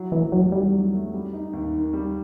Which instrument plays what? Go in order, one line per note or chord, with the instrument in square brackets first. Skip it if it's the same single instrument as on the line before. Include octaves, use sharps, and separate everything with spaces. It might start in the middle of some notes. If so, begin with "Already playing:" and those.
Already playing: [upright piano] F#3 E4
[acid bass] E3 [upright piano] A3
[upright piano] E2 [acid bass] F#3
[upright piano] D#3 [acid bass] G3
[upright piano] F#3
A3
G3
D#4
D#2
D#3
G3